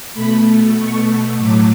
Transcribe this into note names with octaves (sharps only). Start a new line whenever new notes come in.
B2 A3 B5
C#6
A2 F#3 A3 D6